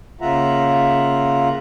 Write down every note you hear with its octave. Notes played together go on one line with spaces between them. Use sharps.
C#3 A#3 F4 E5 F#5 A#5